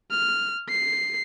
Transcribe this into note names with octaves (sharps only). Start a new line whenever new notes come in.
F6
C7